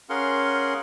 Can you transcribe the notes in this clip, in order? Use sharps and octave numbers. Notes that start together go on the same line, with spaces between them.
C#4 G#4 A#4 F5 F#5 C6